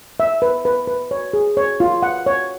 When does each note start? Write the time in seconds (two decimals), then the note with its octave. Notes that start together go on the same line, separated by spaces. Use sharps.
0.20 E5
0.42 B4
0.65 B4
0.87 B4
1.11 C#5
1.33 G#4
1.57 C#5
1.80 F4
2.03 F#5
2.26 C#5